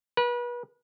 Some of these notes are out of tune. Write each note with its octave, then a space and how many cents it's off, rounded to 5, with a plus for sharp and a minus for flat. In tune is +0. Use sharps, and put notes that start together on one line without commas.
B4 -35